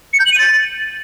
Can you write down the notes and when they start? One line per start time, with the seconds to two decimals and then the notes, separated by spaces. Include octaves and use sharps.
0.13 C#7
0.20 G6
0.26 F#7
0.32 D#7
0.39 A6